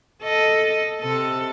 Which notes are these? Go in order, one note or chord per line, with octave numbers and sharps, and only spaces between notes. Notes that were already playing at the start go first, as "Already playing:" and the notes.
A4 D#5
C3 A4